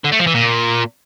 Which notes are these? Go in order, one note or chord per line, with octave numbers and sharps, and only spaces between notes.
D3
A3
F3
E3
A#2